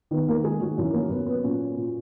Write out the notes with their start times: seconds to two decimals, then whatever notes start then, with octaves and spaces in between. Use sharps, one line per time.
0.11 D#3 B3 B4
0.28 A#3 A#4
0.44 D#3 G#3 G#4
0.61 F#3 F#4
0.77 F#2 E3 E4
0.93 A#3 A#4
1.10 F#2 B3 B4
1.26 B3 B4
1.43 A#2 C#4 C#5
1.76 A#2